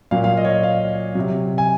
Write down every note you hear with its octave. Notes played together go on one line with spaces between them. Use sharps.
A#2 F#3 F5
F5
D#5
C#5
D#5
F5
C3 F#3
G#5